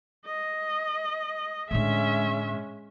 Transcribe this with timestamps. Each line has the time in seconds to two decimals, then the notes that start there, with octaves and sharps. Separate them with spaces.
0.26 D#5
1.71 A2 D3 G#3 C#4 E5